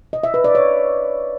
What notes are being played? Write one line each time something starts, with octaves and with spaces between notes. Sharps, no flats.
D#5
E5
B4
D5
C#5